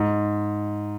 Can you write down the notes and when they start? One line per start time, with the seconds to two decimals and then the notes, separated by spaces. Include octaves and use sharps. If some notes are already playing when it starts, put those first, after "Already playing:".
Already playing: G#2